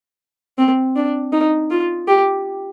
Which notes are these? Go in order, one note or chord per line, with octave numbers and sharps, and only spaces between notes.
C4
D4
D#4
F4
G4